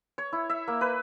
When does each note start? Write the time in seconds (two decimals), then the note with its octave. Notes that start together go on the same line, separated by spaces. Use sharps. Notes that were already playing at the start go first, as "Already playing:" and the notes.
0.18 C#5
0.33 E4
0.50 E5
0.68 A#3
0.81 B4